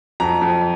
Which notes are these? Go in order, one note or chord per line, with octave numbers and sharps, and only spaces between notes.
F2 A#5
F2